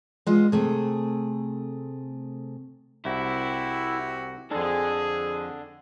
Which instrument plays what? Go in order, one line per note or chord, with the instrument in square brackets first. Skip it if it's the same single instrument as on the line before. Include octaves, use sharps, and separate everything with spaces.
[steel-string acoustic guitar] G#3 B3 F4 D#5
C3 A3 G#4
[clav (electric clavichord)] C2 [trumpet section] C4 F#4 G4 [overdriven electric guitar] E4
[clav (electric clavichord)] F2 A4 [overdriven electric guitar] D3 D4 [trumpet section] G#4